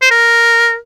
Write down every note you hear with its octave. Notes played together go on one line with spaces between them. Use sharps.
C5
A#4